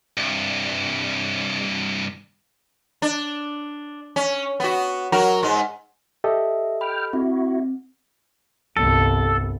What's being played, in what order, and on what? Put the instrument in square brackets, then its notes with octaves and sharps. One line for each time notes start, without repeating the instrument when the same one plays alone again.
[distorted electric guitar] C2 G2
[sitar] D4
C#4
B3 F#4
F#3 F#4 A#4
G#2 G#3
[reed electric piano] G4 A4 D#5 [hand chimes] E5
[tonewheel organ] G5 F6 [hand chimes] B5
[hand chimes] C4 [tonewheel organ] E4 F#4
[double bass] G1 C2 [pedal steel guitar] A4